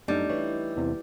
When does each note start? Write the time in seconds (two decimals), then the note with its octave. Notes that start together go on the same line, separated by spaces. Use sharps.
0.08 F#2 G3 A3 D4 D#4
0.29 E3 C#5
0.77 E2 C3